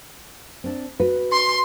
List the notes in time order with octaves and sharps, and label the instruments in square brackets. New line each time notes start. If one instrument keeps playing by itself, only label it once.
[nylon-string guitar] C4 D4
F#4 B4
[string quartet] C6